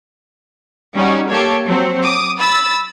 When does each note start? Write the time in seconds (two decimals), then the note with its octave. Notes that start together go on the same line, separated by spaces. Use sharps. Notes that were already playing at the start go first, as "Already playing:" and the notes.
0.96 G3 C#4 D#4 F#4
1.29 A#3 G4 A4 C#5
1.67 F#3 C4
2.01 D6 D#6
2.38 B5 E6 A6